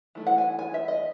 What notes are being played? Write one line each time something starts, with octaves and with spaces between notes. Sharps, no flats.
E3 A3 E4
F#5
G#5
G#5
E5
D#5